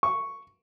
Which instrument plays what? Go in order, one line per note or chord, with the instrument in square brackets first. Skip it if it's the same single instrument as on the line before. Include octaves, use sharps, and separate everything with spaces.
[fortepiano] C#6